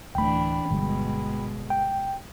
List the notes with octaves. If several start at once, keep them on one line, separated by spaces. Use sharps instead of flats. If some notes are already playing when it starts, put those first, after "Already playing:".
D1 E3 A3 D4 G5 B5
G1 B2 D3 G3 G#3
G5